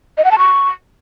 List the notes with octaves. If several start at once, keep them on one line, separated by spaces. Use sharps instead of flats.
D#5
F#5
A5
C#6